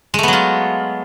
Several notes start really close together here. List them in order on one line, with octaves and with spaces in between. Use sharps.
G#3 A3 B3 F#3 F4